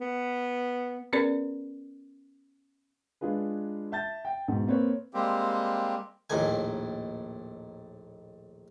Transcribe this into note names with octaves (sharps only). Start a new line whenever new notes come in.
B3
B3 C#4 G#4 A#4 B4 D5
G#3 D4 F4 G#4 B4
E5 A5 G6 A6
G5
G#2 B2
A#3 C4 B4 C#5
G3 G#3 A#3 C4 G4
A#1 D#2 A2 D#3 G#5